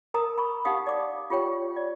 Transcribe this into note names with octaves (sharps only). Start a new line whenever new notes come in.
A#4 A#5 D#6
B5 C#6
D#4 G4 F5 F#5 D#6
D5 D6
F4 G4 C#5 G5
D5